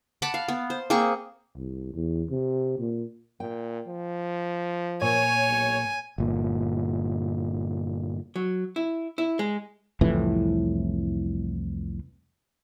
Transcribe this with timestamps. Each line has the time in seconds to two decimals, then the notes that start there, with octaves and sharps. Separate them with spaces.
0.22 F#5 A5 B5 D6
0.34 F5
0.48 B3
0.70 C5
0.90 A#3 C4 G#4 C#6
1.56 C2
1.94 E2
2.31 C3
2.79 A#2
3.40 A#2 G5
3.88 F3
5.02 A#2 C#5 G#5
5.47 B1
6.18 G1 A#2
8.36 F#3
8.76 E4
9.18 E4
9.39 G#3
10.01 C2 F2 A2 E3